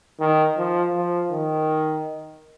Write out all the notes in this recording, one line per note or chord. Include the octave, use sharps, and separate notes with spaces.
D#3
F3
F3
D#3